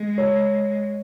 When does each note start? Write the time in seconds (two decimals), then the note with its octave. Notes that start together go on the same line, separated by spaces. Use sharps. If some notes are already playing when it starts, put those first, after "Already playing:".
Already playing: G#3
0.18 C#5